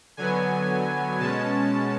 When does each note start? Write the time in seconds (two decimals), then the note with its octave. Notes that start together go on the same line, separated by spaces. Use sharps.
0.17 D3 F#3 B3 G#5
1.19 B2 G#3 C#4 A5